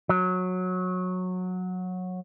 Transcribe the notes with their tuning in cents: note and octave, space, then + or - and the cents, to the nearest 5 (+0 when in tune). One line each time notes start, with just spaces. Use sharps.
F#3 -15